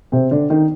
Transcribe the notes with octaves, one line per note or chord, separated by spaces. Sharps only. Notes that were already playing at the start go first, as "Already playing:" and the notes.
C3 C4
D3 D4
D#3 D#4